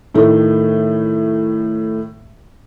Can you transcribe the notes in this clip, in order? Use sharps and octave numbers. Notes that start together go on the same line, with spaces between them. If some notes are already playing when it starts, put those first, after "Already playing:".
A2 D#3 A3